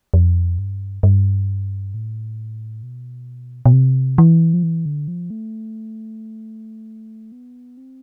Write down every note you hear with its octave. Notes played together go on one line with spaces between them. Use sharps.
F2
G2
G2
A2
B2
B2
C3
E3
F3
E3
D3
F3
A3
B3
C4